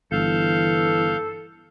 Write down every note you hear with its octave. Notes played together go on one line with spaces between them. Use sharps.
G1 E3 A4 F5 G6